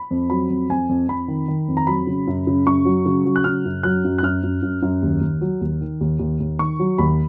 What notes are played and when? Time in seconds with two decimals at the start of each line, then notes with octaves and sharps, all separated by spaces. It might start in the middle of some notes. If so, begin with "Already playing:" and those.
Already playing: B5
0.11 F2
0.30 F#3 B5
0.50 F2
0.69 F2 G#5
0.89 F2
1.08 F2 B5
1.28 D#3
1.48 D#3
1.68 F2
1.77 A#5
1.87 F#3 B5
2.07 C#3
2.27 F#2
2.47 C#3
2.66 F#2 C#6
2.85 F#3
3.06 C#3
3.26 F#3
3.36 F#6
3.44 C#3 F6
3.65 F#2
3.83 F#3 F#6
4.04 F#2
4.18 F#6
4.23 F#2 F6
4.43 F#2
4.62 F#2
4.82 F#2
5.02 D#2
5.21 D#2
5.41 F#3
5.61 D#2
5.81 D#3
6.01 D#2
6.19 D#2
6.40 D#2
6.59 D#3 C#6
6.79 F#3
6.98 D#2 B5